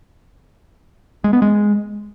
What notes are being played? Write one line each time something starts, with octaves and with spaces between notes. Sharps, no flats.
G#3
B3
G#3